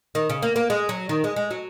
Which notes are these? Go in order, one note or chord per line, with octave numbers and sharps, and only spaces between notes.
D#3
C#3
A#3
A#3
G#3
F#3
D#3
G#3
G#3
F#3